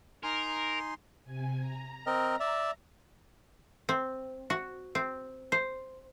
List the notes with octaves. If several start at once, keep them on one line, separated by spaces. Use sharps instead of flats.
D#4 A#4 G#5 C6
C3 G#5
A#5
C4 A#4 D#5
D5 E5
C4
F#4
C4
C5